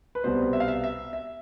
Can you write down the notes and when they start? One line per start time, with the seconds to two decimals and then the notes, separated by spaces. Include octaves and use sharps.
0.15 B4
0.24 C2 B2 G3 B3 C5
0.53 E5
0.60 F5
0.68 E5
0.84 E5
1.13 E5